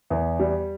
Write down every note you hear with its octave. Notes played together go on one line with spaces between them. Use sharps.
E2
G3